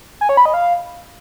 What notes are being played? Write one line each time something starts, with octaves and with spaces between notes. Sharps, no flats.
G#5
C#5
B5
D#5
F5